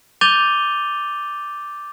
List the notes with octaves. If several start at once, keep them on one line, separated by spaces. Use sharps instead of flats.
D6 G6 A6 D#7 F7 G7